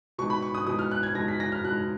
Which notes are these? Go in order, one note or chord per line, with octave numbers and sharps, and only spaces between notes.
B2 G#3 D#4 C#6
B5
C#6
D#6
B2 G#3 D#4 D#6
F6
F#6
G#6
B2 G#3 D#4 A#6
B6
A#6
F6
B2 G#3 D#4 F#6